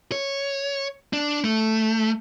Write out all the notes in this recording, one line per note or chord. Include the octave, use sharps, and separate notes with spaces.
C#5
D4
A3